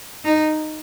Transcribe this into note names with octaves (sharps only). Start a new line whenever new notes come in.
D#4